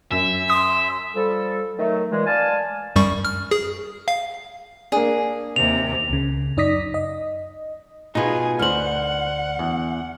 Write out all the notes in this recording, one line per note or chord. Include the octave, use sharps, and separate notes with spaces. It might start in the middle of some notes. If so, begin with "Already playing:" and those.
F#2 E5
C6 D#6
F3 G3 A4
D#3 F#3 A3
A#2 E3 G#3
D5 F5 G#5 A5
F#2 G3 C#6
F6
G#4
F5
A#3 D4 G#4
D#2 C3 F7
C#2 C#3
F#2 D#4 D5 D#6 A#6 B6
D#5
B2 D#4 F4 G#4 B4
D2 C5 F#5 F6 F#7
E2